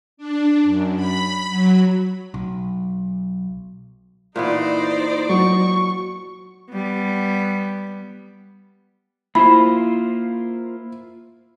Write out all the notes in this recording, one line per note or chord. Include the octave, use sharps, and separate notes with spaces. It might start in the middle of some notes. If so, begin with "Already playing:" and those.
D4
F#2
B5
F#3
B1
A#2 E3 B3 D#4 C5 D5
F#3 C#6
G3 B3
A#3 E4 F4 C5 B5